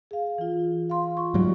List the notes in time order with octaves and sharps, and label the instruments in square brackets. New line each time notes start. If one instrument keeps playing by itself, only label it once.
[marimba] G#4 F5
E3 F4
F5 C6
F4 C#6
[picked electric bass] G#2 F#3 G3